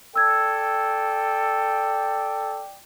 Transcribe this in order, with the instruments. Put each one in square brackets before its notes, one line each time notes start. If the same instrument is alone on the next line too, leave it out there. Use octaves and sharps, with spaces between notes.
[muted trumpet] A4 [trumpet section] D5 G5 [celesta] E6 G#6